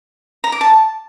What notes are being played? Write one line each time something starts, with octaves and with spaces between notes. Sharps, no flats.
A#5
D6
A5